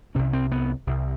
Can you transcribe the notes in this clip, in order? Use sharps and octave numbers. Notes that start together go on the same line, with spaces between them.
C2 C3 C#4
C4
B3
C2 C3